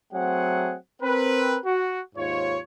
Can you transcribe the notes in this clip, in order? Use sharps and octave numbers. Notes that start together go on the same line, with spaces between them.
F#3 A3 C4 G#4 F#5
C4 A#4 B4
F#4
D#2 G#2 F4 C#5